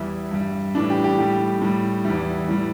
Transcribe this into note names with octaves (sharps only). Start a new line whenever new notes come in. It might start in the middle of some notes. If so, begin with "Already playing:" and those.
Already playing: E2 E3 G3 E4
G2 G3
A2 E3 G3 D4
G4
G4
A2 G3 G4
A2 G3
E2 E3 G3 E4
A2 E3 G3